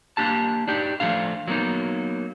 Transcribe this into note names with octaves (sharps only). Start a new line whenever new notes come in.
A#3 D4 G4 A5
D4 D#4 G4
F3 G#3 A3 D4 F5
F#3 A#3 B3 D#4